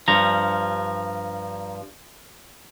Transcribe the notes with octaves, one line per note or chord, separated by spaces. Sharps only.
G2 F3 A#5